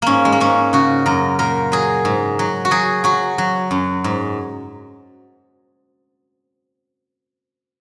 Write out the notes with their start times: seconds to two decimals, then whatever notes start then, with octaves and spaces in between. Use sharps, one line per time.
0.02 G#2 A#3 C#4
0.25 G#3
0.32 A#3
0.40 G#2 C#4
0.73 C#3 F#4
1.06 F#2 A#4
1.39 A#2 A#4
1.72 F#3 G#4
2.05 G#2
2.39 F#3
2.65 F#4
2.71 F#3 G#4
3.04 F#3 F#4
3.38 F#3
3.71 F#2
4.04 G#2